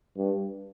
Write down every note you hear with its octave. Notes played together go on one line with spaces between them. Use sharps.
G2